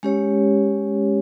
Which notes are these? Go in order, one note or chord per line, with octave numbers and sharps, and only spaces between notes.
G#3 C#4 G4 C#5